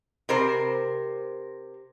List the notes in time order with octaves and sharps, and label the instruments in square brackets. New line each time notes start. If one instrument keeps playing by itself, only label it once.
[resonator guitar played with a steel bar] C3 A#4 C5